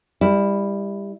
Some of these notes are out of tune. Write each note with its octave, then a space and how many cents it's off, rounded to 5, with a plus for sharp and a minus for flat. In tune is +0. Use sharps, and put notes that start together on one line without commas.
G3 +25 E4 +0